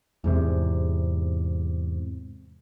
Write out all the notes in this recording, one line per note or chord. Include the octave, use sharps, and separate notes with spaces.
E2 G#2 C3